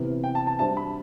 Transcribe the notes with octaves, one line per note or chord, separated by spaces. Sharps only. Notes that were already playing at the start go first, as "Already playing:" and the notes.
Already playing: C3 E3 B3
G5
A5
A5
G3 D4 F#4 C5 E5 A5
B5